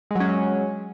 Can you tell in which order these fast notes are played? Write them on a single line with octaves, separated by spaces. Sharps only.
G#3 F#3 C#4